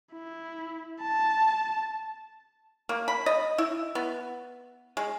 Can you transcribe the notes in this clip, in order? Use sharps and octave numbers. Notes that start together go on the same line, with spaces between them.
E4
A5
A#3
B5
D#5
E4
B3
G#3